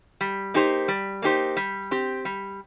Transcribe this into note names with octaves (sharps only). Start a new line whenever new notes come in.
G3
A#3 D#4 G4 C5
G3
A#3 D#4 G4 C5
G3
C4 G4
G3